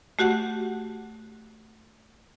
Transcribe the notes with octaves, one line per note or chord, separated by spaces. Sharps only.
A3 F#4 G4 F#5